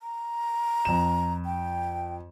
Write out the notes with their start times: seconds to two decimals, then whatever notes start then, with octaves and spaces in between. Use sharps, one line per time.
0.01 A#5
0.85 F2 E7
1.45 G5